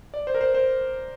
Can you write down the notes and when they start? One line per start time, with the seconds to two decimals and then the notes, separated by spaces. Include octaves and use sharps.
0.14 D5
0.27 C5
0.35 A#4
0.41 C5
0.54 C5